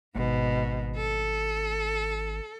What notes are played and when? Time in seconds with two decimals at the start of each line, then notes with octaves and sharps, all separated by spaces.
0.16 G#1 G#2 B2
0.96 A4